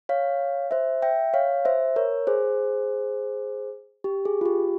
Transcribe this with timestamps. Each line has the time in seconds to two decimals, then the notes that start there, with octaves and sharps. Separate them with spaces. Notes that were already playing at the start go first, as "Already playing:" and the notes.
0.09 C#5 F5
0.71 C5 E5
1.02 E5 G5
1.34 C#5 F5
1.65 C5 E5
1.96 A#4 C#5
2.27 G#4 C5
4.04 G4
4.25 G#4
4.41 F4
4.46 G4